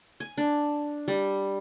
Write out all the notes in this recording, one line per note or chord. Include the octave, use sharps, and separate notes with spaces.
G#5
D4
G3